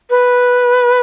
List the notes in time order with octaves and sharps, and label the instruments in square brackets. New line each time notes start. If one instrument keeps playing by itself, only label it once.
[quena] B4